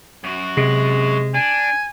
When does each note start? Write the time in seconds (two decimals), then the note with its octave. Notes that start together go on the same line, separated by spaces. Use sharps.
0.24 F#2 F#4
0.57 C3 G#3
1.34 D4 G#5